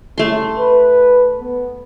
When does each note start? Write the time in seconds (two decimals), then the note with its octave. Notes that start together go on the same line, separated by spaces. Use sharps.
0.18 C2 C#3 A3 C6
0.56 B4
1.40 B3